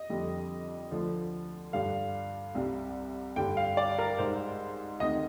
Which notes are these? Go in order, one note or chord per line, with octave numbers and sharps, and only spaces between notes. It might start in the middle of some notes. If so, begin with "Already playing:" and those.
Already playing: D#5
F2 D3 G3
D2 D3 F3
G2 D3 G3 F5
C2 C3 G3
G2 D3 G3 G5
F5
D5
A#4
G#2 G3 C5
D2 C3 D#3 D#5